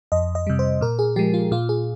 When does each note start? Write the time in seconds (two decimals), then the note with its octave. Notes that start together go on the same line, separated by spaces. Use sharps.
0.12 F2 D#5
0.35 D#5
0.47 C3 G3
0.59 C5
0.81 A#2 A#4
0.99 G#4
1.16 F3 G#3 G4
1.34 F4
1.51 A#2 F4
1.69 G#4